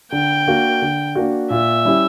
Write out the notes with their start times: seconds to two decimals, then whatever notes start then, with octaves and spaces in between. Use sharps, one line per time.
0.12 D3 G5
0.48 A#3 D4 F#4
0.82 D3
1.15 A#3 D4 F#4
1.50 A#2 E5
1.85 G3 C#4 E4 G4